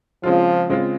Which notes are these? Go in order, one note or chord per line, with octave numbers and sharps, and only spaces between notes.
C#3 F3 G#3 C4 F4
C#3 G#3 C4 F4